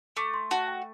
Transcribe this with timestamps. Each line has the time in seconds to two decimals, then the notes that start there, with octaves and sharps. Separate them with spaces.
0.17 A3 D6
0.34 C6
0.51 F#4 A5
0.67 G5